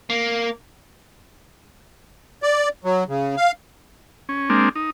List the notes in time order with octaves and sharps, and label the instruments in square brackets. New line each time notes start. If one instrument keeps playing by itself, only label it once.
[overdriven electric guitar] A#3
[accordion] D5
F#3
C#3
F5
[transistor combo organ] C#4
G#3 A#3 C4 D4
D#4